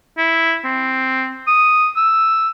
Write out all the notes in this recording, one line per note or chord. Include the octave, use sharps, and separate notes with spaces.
E4
C4
D#6
E6